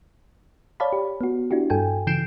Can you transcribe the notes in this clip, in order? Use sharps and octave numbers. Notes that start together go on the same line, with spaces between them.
C#5 D5 F5 A5 B5
G4
B3 F#4
D4 E4 F#4 G4
G2 A4 G5 G#5
C#3 E3 G6 C7 D7 E7